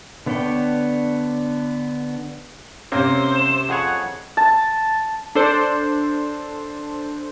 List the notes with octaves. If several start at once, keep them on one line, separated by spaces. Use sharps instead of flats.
D3 B3 D4 C#5 G5
C3 A#3 C4 C#4 C5
E7
F2 G#4 C#5 F#5
A5
D4 A4 C5